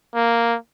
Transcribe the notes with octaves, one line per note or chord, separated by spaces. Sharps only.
A#3